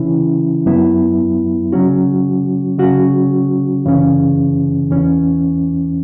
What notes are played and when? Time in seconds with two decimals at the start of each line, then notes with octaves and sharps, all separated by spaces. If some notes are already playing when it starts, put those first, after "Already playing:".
Already playing: C#3 E3 C#4 E4
0.66 F#2 F#3 B3 E4
1.72 C#3 F#3 C#4 F#4
2.78 C#3 F#3 C#4 F#4
3.85 F#2 C#3 E3 C#4
4.90 E2 E3 C#4